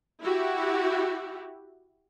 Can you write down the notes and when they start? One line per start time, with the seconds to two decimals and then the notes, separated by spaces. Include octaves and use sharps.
0.22 E4 F#4 G4